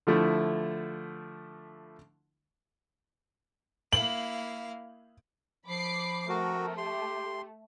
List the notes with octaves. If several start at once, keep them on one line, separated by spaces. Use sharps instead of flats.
D3 F3 A3 E4
A#3 E4 F5 F#7
F3 B5 D6 C7
A3 C4 F#4 A#4
G4 C6